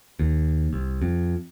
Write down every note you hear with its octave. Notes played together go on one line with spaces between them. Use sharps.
D#2
C2
F2